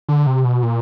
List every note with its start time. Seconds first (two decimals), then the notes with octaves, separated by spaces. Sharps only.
0.09 D3
0.27 C3
0.45 B2
0.63 A#2